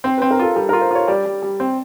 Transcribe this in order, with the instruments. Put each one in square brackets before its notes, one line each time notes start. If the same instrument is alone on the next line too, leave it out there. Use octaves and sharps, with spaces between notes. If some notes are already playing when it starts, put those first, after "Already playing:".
[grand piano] C4 [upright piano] C5
[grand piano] C4 [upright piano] B4
[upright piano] A#4
[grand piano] F4 [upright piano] A4
[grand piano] G3 [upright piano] A4
[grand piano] F4 [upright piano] A#4
[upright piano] C5
[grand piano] F4 [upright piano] C#5
[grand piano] G3 [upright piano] D5
[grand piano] G3
G3
C4